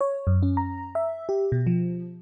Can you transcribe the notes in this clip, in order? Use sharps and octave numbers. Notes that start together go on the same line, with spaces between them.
C#5
F#2
C#4
A#5
E5
G4
B2
F3